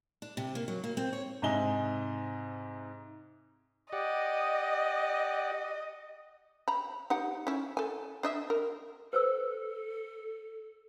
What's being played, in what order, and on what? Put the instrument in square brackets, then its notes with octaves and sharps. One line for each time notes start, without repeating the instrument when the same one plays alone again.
[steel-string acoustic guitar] D4
C3
A#3
F#3
A#3
C4
C#5
[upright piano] G#2 C3 D#5 E5 G#5 G7
[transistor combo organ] G4 D5 F#5 [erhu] D#5
[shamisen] A#5 B5
D#4 G4 F#5
C#4 E4
A4 G#5
D4 D#5 E5
A#4
[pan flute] A4 [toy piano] B4 C5 E6